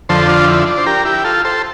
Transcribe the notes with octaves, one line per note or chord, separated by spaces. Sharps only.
F2 D3 F3 A4 C5
D4 F4
E4
D4
C5
G4 A#4
E4 G4
F4 A4
A4 C5